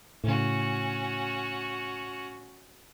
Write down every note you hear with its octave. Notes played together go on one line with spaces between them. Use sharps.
A2 C#3 C#4 F#4